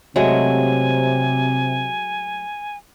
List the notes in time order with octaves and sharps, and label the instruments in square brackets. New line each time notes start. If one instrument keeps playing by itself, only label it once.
[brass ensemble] C3 [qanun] F#3 G#3 A3 [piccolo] G#5